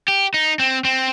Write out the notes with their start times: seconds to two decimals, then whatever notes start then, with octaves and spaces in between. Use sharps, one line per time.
0.08 G4
0.34 D#4
0.59 C4
0.85 C4